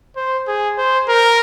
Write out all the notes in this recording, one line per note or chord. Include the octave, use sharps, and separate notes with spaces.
C5
G#4
C5
A#4